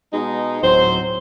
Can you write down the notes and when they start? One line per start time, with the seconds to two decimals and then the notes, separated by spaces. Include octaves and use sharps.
0.13 B2 G#3 D#4
0.63 D1 F#3 C4 C5